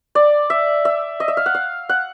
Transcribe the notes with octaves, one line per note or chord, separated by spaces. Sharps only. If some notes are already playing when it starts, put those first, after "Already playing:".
D5
E5
E5
D#5
E5
F5
F#5
F5
F#5